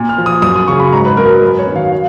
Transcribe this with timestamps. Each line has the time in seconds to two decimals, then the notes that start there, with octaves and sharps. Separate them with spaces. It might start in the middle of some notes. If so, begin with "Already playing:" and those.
Already playing: A#2
0.09 F6
0.18 F3
0.26 D#6
0.42 F#2 D#6
0.56 D#6
0.68 C#3 F#3 C#6
0.80 B5
0.92 G#2 A#5
1.05 B4
1.17 F#3 A#4
1.30 B4
1.42 F#2 B4
1.58 C#5
1.67 F#3
1.72 D#3 F5
1.92 F5